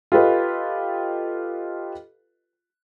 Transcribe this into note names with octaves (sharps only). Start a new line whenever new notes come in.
F4 G4 A4 B4 D#5